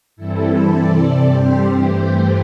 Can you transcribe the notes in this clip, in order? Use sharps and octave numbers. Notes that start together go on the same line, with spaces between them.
G2 E3 G3 C4 E4 A4
C3 E3 C4 A4 D5
G2 G3 C4 G4 C5
G2 E3 A3